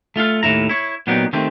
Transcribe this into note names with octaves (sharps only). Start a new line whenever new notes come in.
A3 F4 A4 F5
D#2 A2 E4 A#5
E4 C#5
A#2 F#3 B3 D#4 G4
D#3 A3 C4 G4